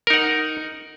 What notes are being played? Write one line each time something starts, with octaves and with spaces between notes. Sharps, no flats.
D#4 A#4 F#5